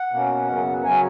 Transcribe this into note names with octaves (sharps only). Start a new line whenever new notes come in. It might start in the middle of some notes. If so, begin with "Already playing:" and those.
Already playing: F#5
B2 A#3 C#4
F#2 C#3 F#3 B3
C#3 F#3 C#4 G#5